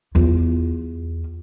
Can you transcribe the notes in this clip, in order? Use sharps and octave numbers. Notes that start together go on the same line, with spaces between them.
E2 F4